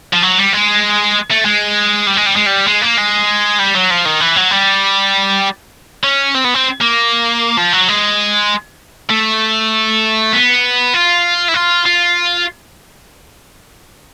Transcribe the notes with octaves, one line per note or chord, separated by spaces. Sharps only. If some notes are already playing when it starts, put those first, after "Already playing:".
F3
F#3
G3
G#3
A3
G#3
G3
G#3
G3
G#3
G3
G#3
A#3
G#3
G3
F#3
F3
D#3
E3
F#3
G3
C#4
C4
B3
C4
A#3
F3
F#3
G#3
A3
B3
F4
E4
F4
F4